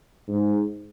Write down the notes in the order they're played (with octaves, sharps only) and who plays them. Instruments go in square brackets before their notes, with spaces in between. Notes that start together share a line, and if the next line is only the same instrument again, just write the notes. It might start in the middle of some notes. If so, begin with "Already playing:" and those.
[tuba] G#2